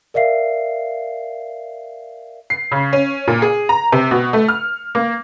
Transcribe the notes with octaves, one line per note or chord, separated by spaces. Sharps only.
A#4 D5 E5 F5 C7
C7
C#3
C#4
A#2
G#4
A#5
C3
B2
A3
F6
A#3